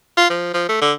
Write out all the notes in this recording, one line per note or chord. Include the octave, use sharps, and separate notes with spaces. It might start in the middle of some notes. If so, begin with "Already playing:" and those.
F4
F3
F3
A3
D3